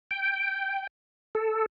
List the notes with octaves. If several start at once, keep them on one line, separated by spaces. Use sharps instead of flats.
G5
A4